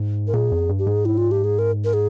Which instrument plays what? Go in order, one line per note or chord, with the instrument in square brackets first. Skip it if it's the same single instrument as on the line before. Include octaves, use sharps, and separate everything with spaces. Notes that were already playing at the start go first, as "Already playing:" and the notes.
Already playing: [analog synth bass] G#2
[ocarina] A#4
[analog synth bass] A#2 [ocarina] G#4
[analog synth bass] F2
G2
[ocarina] G4
[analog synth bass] G#2 [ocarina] G#4
[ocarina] E4
F4
G4
G#4
A#4
A#4
G#4